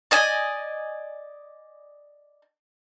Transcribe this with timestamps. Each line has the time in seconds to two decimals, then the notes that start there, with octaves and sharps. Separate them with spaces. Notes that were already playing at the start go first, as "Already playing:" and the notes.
0.11 D5 D#5 G#5